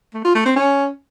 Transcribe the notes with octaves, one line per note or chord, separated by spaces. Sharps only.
A3
F4
A3
C4
C#4